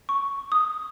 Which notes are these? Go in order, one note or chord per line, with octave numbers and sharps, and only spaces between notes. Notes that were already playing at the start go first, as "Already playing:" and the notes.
C#6
D#6